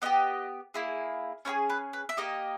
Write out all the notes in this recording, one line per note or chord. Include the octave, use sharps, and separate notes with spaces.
B3 E4 G4 D#5
A#3 E4 G#4
C#4 E4 G#4 C#5
B4
B4
E5
A#3 D#4 G4 D#5